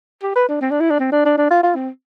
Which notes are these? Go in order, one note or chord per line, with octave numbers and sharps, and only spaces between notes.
G4
B4
D4
C4
D4
E4
D4
C4
D4
D4
D4
F4
F4
C4